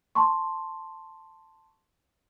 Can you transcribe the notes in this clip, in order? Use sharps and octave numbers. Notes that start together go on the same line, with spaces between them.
A5 C6 C#6